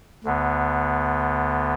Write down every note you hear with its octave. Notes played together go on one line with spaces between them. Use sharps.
D2 D3 B3